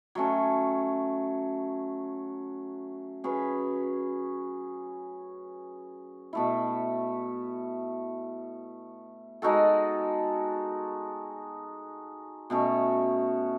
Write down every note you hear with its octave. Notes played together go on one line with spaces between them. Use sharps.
F#3 A3 C#4
F#3 C#4 G#4 B4
B2 A3 E4
G#3 D#4 F#4 A4
B2 A3 C#4 F#4